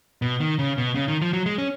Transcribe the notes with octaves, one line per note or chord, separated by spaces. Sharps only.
B2
D#3
C#3
B2
C#3
D#3
F3
F#3
G#3
C#4